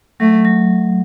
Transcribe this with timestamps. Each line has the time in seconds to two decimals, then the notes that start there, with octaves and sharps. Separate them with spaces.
0.20 F#3 A3
0.45 F#3